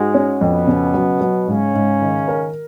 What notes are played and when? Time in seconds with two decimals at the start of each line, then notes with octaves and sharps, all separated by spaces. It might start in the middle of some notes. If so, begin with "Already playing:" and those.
Already playing: G#2 G#3 F#4
0.14 C#4
0.40 F2 B2 B3
0.67 C#3
0.94 F#3
1.21 F#3
1.47 G#2 C#3 C#4
1.74 G#2
2.02 D#3
2.28 A#4